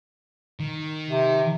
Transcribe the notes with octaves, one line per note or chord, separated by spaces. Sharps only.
D#3
C3